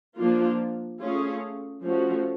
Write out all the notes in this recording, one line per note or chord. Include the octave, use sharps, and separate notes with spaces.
F3 A#3 D4 F4
A3 C#4 F4 G#4
F3 A3 C#4 F#4